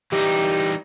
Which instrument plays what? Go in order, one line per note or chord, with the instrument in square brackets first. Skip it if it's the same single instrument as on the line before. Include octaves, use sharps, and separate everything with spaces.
[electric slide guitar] E3 G3 D#4 [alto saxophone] G4